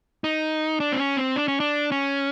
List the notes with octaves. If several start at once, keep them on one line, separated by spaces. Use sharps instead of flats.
D#4
D4
C4
C#4
C4
D4
C#4
D4
C#4